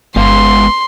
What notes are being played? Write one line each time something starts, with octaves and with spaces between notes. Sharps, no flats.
G1 G#3 B3 F5 C6